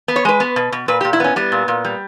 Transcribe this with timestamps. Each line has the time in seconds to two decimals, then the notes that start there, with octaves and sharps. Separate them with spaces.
0.08 B3
0.16 C#5
0.25 G#3 B4
0.40 B3
0.56 B2
0.72 B2
0.88 A#2 B4
1.01 G4
1.05 A#2
1.13 E4
1.20 B3 C#4
1.36 G3 B3
1.52 A#2
1.68 A#2
1.85 G3